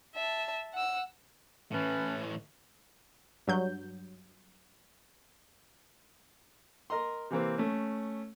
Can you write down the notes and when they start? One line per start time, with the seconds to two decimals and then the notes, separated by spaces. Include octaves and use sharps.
0.15 E5 A5
0.73 F#5 E6
1.72 A2 E3 C#4 B4 A5
3.47 G2 F#3 G6
6.90 A#4 D#5 A#5 C6
7.30 C3 E3 A#3 C4
7.58 A3 C#4